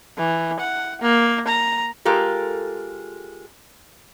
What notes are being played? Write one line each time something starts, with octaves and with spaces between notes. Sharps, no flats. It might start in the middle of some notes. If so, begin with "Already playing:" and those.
E3
F#5
A#3
A#5
G#3 F4 G4 A4 A#4